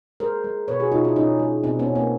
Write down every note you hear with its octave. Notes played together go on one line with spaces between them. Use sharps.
G#3 A#4 C5
G#3
B2 B4 C#5
F#4 G#4
B2 D#4 F4
D4 E4
B2 C#4 D#4
G#3
B2 C4 D4
B3 C#4
B2
A#3 C4